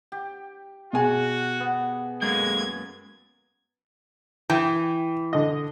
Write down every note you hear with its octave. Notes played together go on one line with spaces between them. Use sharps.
G4
B2 F#4 G#4 G#5
B3
F#2 G#3 A#3 G#6
E3 G5
D3 D#5